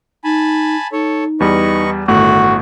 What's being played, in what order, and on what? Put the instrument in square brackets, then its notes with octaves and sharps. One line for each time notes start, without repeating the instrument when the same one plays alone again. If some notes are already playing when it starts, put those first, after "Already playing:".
[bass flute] D#4 [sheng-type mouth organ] G#5 A5 B5
[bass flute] D#4 [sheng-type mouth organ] A4 C#5
[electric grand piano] E2 G3 [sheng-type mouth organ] B4 D#5 C#6
[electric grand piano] G1 A2 A3 [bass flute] D#3 [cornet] F#4 [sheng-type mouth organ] F#6